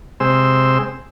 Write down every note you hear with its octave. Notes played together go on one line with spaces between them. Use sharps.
C3 G#3 C5 E6